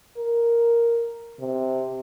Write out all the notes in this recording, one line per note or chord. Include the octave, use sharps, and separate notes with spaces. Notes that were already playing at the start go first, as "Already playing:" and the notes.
A#4
C3